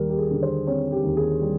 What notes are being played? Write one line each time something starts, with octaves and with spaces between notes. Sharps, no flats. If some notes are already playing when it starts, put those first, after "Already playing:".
Already playing: D#2 G3 A#4
G4
G#4
D3
C5
C4 C#5
G4
D#2
G#4
G3